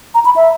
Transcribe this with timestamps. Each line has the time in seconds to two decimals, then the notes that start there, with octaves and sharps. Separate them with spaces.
0.15 A#5
0.25 B5
0.36 E5